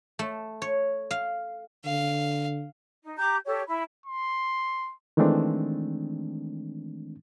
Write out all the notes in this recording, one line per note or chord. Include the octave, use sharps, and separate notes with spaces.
A3
C#5
F5
D3 F5
D#4
G4 A#5 D6 G6
G4 A4 C#5
E4 B5
C6
D#3 E3 G#3 A3 C4 D4